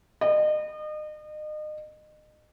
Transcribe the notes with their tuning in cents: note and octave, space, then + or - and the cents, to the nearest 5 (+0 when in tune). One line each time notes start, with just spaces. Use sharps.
D#5 -35